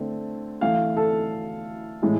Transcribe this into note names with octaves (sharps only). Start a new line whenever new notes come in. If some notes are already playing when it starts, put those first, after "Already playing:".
Already playing: D3 A3 C4
E3 A3 E4 F5
A4
A2 E3 G#3